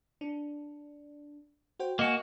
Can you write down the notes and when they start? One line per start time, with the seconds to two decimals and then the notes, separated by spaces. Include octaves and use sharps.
0.21 D4
1.79 F#4 C5 G5
1.99 A#3 F#4 D#5 G#5